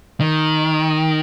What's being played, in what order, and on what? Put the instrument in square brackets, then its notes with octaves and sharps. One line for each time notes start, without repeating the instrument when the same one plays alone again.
[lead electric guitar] D#3